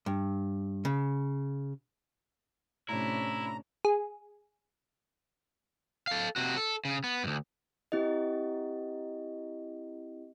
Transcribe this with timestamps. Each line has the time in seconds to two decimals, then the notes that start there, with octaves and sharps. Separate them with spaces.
0.06 G2
0.85 C#3
2.89 A2 C3 C#4 D4 E4 A#5
3.85 G#4
6.07 A4 F5
6.36 C3 F#4
6.57 A4
6.85 C#3
7.04 B3
7.24 D2 G2
7.92 C4 E4 G4 D#5